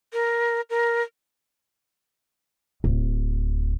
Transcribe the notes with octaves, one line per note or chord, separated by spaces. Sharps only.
A#4
A#4
D1